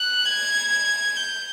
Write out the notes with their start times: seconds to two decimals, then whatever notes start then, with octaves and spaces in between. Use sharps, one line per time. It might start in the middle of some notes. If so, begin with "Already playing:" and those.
Already playing: F#6
0.26 G#6
1.17 G6